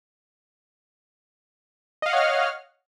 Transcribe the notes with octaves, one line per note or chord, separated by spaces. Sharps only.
C#5 D#5 F5 F#5 F6